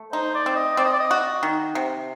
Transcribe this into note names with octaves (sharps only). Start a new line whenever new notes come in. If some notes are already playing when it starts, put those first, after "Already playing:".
Already playing: A3
D#4 C5
D5
C4
D#5
C4 D5
D#5
D5
D#5
F#4
D#3
C3